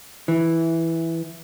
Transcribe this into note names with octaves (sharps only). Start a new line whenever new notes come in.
E3